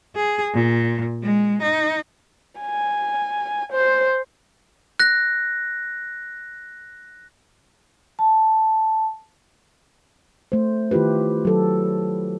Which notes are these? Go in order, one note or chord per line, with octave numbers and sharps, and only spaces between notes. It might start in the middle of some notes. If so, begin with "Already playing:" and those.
G#4
A#2
G#3
D#4
G#5
C5
F#6 A#6
A5
A3 C5
D#3 E4 F4 G4 B4
F#3 A4